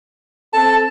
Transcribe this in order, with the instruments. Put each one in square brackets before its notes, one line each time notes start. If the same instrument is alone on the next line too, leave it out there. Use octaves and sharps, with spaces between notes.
[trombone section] C4 A4 [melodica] A5